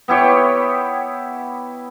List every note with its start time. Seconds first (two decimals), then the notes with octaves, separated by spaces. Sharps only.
0.08 B3 E4 G4 C#5